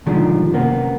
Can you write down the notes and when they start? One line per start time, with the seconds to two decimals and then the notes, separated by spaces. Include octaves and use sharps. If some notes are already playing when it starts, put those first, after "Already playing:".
0.06 B2 D3 D#3 F3 G3 G#3
0.53 F#2 C3 A#3 B3